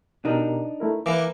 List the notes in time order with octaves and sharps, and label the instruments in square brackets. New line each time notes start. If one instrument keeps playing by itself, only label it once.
[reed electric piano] B2 G4 A#4 [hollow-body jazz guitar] D4 D#4
[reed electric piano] A3 E4 A#4
[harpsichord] E3 A#3 [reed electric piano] B4 D6